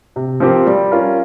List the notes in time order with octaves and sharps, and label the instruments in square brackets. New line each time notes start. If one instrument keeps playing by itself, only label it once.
[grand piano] C3
F3 C4 G4 A#4
G3
C#4 F4 A#4